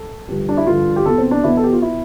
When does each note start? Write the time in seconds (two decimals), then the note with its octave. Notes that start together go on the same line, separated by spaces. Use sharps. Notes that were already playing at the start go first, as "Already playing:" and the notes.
Already playing: A4
0.28 G2 D3 F3 G4
0.49 D4
0.57 E4
0.66 G2 D3 F3 F4
0.96 G4
1.06 E2 B2 A4
1.18 C4
1.31 D4
1.44 E2 B2 E4
1.57 A4
1.64 G4
1.73 F4
1.82 B2 E4